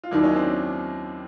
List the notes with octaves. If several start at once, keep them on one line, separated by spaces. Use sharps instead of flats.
F4
D#2 D#3 F#3 D4 E4
C#4 D#4
C4 D4